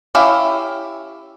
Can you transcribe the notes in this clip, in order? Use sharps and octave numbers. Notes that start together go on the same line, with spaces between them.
C#4 E4 G4 E5 F5